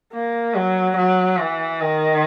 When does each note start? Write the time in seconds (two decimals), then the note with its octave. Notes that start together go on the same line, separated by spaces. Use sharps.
0.13 A#3
0.55 F#3
0.97 F#3
1.39 E3
1.81 D#3